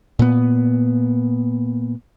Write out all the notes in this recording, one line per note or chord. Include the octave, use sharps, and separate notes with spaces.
A#2 B3